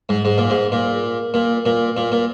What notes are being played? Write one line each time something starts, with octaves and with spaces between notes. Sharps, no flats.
G#2
G#2
A#2
G#2
A#2
A#2
A#2
A#2
A#2